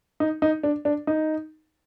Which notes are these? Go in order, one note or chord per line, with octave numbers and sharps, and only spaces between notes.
D#4
D#4
D4
D4
D#4